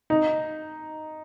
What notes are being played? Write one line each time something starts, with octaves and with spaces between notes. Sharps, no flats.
D#4